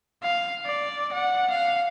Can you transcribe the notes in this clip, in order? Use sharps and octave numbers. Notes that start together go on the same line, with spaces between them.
F5
D5
F#5
F5